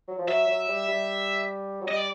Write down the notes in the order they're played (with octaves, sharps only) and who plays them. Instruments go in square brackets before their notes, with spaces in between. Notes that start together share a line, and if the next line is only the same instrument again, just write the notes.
[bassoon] F#3
F3
[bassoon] F#3 [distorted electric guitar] E5
[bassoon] F#3
G3
G3
F#3
[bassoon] G3 [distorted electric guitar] D#5
[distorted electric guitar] D5